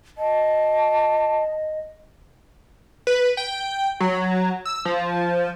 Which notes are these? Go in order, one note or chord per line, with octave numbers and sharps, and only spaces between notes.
D#5 A5
B4
G5
F#3
E6
F3